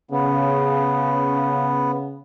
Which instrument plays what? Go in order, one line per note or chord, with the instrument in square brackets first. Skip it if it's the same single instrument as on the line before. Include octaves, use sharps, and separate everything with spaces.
[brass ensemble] C#3 [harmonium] B3